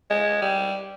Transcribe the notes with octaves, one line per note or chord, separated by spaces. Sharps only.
G#3
G3